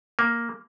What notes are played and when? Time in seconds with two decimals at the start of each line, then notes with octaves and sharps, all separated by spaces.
0.19 A#3